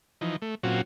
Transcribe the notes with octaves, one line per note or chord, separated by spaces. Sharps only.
E3 F3 D#4
A3
A#2 F#3 C4 C#4 F4 F#4